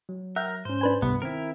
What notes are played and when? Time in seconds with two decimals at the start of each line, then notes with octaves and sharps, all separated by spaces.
0.09 F#3
0.36 A#4 E5 F#5 G5
0.65 G#2 C#4 C5
0.81 D4 B4 G#5
1.02 C2 G2 B3 B5
1.22 D#3 C4 E4 A#4